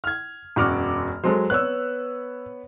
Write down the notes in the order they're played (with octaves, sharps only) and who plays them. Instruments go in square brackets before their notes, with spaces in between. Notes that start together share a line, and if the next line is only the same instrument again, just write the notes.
[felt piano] F6 G#6
[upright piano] E1 F#4 D6 [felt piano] F#2 F6
[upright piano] F#3 G#3 A4 [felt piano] C5
[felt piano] B3 B4 C#5 [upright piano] E6 F#6